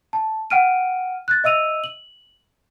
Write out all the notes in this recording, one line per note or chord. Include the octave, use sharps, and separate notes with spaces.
A5
F#5 G5 F6 D7 D#7
F#6 A6
D#5 E5 E6 D#7 F7
F#7